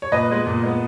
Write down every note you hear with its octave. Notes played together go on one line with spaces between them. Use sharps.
C#5
A#2 B4 D#5
G#3 B3
A#2
G#3 B3